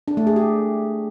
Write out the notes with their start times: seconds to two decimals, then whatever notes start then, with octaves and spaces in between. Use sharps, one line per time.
0.08 D4
0.17 A3
0.27 G#4
0.36 G4